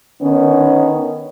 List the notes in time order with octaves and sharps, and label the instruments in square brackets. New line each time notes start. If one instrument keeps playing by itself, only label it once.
[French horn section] D3 D#3 B3 C#4